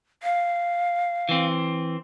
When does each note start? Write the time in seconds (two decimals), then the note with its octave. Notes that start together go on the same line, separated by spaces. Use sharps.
0.23 F5
1.29 E3 C4